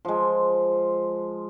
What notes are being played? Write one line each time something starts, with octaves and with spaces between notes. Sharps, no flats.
F3 G#3